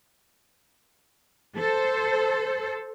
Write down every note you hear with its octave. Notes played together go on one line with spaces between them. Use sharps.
A4 C5